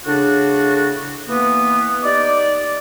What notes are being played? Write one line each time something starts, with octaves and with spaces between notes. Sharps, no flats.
A2 C#3 D4 F#4
E3 A#3 B3
D#4 G4 D5